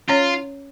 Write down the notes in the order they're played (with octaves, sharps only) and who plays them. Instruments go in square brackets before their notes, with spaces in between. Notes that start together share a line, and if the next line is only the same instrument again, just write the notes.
[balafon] C#4 C#5 [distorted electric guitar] F4